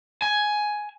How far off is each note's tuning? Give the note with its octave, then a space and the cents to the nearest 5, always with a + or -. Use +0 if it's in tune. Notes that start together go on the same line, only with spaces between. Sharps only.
G#5 +10